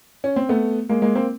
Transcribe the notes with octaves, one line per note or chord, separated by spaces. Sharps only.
C#4
C4
A3 B3
G#3 A#3
G#3 A#3
A#3 C4